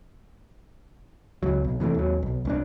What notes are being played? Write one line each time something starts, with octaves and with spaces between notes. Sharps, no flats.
C#2 F#3
B1
C3 E3 F3 A3
D#2 F#3
B1
C2 C#4 D4